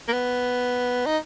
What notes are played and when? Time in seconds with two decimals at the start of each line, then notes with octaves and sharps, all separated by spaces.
0.08 A#3
0.13 B3
1.06 D#4